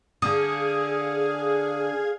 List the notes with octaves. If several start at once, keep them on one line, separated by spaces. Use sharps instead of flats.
D3 G#4 F5 D#6 G#6